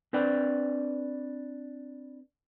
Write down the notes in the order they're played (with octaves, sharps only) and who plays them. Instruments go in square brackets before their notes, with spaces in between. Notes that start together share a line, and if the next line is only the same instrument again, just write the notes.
[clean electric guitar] C4 D4 B4 D5 G5